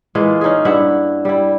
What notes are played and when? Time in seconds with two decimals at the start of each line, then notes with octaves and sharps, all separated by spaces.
0.15 E3 G#3 A#3 F4
0.41 C#4 D#4 F4 G#4
0.65 G2 E4 E5 F#5
1.25 G3 E4